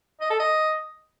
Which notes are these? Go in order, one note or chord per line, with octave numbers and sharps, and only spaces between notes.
D#5
A4
D#5